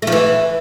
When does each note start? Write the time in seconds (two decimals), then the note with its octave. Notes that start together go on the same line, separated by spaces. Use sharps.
0.02 A3
0.07 F3
0.12 E3